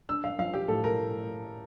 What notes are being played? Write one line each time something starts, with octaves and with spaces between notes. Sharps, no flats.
D4 E6
F5
F3 F5
G4
A2 A4
A#4